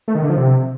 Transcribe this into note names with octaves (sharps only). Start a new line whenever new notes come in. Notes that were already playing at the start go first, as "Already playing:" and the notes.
A3
D#3
D3
F3
C3